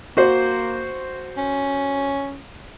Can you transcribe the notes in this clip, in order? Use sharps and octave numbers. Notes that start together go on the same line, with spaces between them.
A#3 F#4 C5
C#4